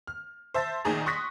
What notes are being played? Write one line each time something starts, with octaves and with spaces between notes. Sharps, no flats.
F6
C5 E5 A5 A6
A#1 D#3 D#4 G#4 A#5
C6 C#6 D#6 F#6 A#6 B6